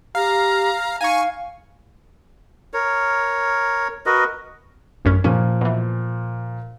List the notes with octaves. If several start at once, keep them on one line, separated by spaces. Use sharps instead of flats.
G4 F5 A#5
D#4 F5 G#5 C#6
A#4 C#5
F#4 A#4 B4 D#5
A1 F#2 C#4
A#2 F3 C#4
B2 E3